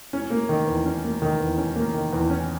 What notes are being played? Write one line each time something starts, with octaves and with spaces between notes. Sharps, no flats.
C#4
A#3
D#3
E2
C#4
A#3
D#3
E2
C#4
A#3
D#3
E2
C#4